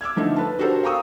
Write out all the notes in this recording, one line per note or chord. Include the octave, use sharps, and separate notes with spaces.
D6 E6 F6 G#6
D3 F3 A3 D#4
B4 A5
D4 F#4 G4 A4 A#4 C5
F5 G5 A#5 C#6 D#6 E6